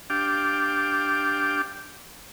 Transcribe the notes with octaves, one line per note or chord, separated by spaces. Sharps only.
D4 G4 F5 G5 D6